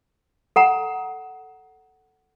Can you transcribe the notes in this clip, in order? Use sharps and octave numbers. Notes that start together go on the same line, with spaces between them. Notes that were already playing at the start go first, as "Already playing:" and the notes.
A4 F#5 A#5